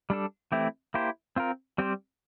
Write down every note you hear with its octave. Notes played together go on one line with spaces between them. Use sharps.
G3 D4 A4
E3 A3 C4 E4 G4
A#3 E4 G4 C5
C4 F4 A#4
G3 C4 G4 C5